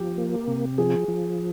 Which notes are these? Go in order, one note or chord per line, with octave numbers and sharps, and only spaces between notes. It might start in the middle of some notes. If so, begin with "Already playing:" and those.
Already playing: F3 G4
A#3
C3
F3 G#4
F3